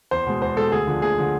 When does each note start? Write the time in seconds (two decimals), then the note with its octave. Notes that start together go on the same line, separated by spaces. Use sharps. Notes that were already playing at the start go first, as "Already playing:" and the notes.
0.11 E2 C5
0.26 B2 G#3
0.42 E2 C5
0.56 B2 G#3 A4
0.72 D2 G#4
0.87 D3 F3
1.02 D2 G#4
1.18 D3 F3